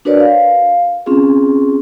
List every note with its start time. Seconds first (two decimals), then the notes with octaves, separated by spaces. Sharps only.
0.05 D4 F#4 A#4 B4 C#5 D5
0.20 F5
1.06 C4 C#4 F4 G#4